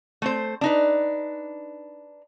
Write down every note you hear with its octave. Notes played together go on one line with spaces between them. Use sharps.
A3 C4 C5
D4 D#4 B4